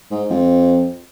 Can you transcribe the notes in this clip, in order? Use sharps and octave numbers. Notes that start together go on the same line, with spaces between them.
G#2
F2